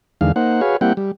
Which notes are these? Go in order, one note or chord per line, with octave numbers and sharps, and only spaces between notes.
E2 D3 D#3 G#3 F5
A#3 D#4 C5 F#5
F#4 G#4 B4 C#5 F5
G3 A#3 C4 E4 F#5 G5
G3